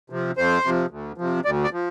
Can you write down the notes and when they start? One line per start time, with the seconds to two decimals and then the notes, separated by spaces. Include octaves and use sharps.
0.10 C3 F3
0.37 F2 C5
0.64 C3 F3
0.91 D2
1.18 C3 F3
1.45 D2 D5
1.64 D5
1.73 F3